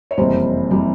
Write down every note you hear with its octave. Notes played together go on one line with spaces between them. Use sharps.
C#5
F#1 F2 C3 E3 G3 C5
C3 E3 G3